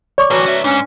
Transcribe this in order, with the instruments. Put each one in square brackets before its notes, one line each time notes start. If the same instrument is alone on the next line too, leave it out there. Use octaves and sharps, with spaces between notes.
[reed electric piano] C#5 [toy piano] D5 C#6 D6
[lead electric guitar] A2 E3 [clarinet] F#4 [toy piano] B4 A5 A#5
[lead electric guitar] C#4 E5
[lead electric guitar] G#2 [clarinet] C#4 [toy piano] D4